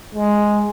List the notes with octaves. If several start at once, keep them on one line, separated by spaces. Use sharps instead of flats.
G#3